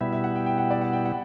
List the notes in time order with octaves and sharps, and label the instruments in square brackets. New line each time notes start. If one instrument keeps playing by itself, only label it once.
[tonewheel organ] B2 G3 B3 E4 [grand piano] E5
[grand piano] E5
F#5
G5
G5
F#5
D5
F#5
G5
F#5